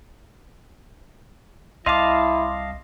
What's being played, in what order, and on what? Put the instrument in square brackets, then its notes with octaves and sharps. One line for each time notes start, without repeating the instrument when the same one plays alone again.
[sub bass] C2 [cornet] E4 [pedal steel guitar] D#5 F5 A5 [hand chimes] C6 D6